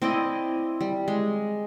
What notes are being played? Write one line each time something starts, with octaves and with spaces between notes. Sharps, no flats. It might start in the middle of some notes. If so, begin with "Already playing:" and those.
C4 E4 D5 D#5
G3
G#3